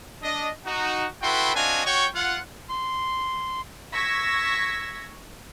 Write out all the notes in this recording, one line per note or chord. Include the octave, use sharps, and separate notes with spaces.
D4 D#5
D#4 F#4
E4 F#4 A4 B4 G5 C6
C4 D4 F#4 D#5 F5 G#5
F#4 C#5 G5 C#6
F4 F#5
C6
C#6 E6 G#6 A#6 B6